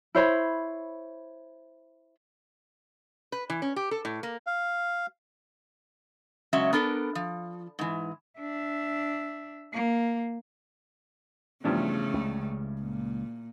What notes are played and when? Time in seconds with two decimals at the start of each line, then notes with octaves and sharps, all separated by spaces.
0.15 E4 C5 C#5 B5
3.32 B4
3.50 E3
3.62 C#4
3.76 G4
3.91 A4
4.05 A2
4.23 A#3
4.47 F5
6.53 C#3 F#3 G#3 C#4 E5
6.73 B3 D4 A4 A#4
7.15 F3
7.79 G#2 E3
8.39 D4 E5
9.73 A#3
11.64 E2 G2 C#3 F3 A3
12.14 C#2
12.81 A#2